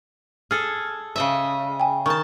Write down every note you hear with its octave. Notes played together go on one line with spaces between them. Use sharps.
G#4 A4 F6
C#3 D#5 E5
G5 G#5
D#3 A5 C#6